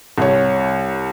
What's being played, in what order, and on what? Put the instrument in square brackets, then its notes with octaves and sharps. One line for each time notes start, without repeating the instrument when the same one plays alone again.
[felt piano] C2 C#5